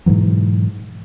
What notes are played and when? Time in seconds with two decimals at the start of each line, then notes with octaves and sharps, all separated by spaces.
0.06 G#2 B2 E3 F#3